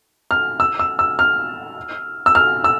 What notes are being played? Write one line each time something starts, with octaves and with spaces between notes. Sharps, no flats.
F6
E6
E6
E6
F6
E6
F6
E6